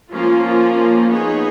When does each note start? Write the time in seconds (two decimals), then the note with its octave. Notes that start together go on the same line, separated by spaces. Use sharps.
0.12 F3 A#3 C#4 F4
1.11 B3 D#4 G#4 C#5